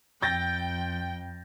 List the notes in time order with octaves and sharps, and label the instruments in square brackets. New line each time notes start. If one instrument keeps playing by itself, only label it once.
[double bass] F2 [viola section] G5 [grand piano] G6 A6 A#6